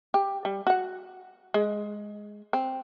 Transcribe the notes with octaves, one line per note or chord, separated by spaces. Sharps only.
G4
G3
F#4 F#5
G#3
C4